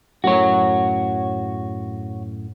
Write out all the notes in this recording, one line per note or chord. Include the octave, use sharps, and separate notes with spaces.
F#2 A2 F#4 C#5